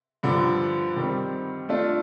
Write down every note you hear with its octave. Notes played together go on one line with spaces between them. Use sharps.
G2 D3 F3
D#3 G3 C4
A3 D4 F4